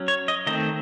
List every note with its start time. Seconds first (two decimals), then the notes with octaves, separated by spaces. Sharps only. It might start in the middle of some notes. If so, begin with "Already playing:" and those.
Already playing: F#3 C#4
0.08 C#5
0.28 D#5
0.47 D#3 A3 C4 D#5